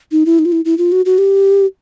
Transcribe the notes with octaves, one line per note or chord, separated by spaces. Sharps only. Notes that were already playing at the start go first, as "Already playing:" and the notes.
D#4
E4
D#4
F4
E4
E4
F4
F#4
F#4
G4